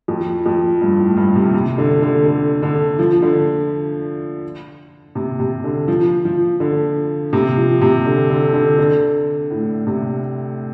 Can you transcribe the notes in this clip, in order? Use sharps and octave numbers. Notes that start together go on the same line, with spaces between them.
F2
F2
G2
A2
G2
C3
C3
D3
D3
D3
D3
F3
D3
C3
C3
D3
F3
F3
D3
C3
F3
C3
D3
D3
D3
D3
A2
C3